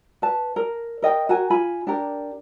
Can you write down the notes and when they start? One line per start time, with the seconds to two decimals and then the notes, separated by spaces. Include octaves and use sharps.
0.22 B4 A5
0.56 A#4
1.02 A#4 D#5 G5
1.29 F#4 A#4 G#5
1.50 F4 G#5 B5
1.87 D4 G4 A#4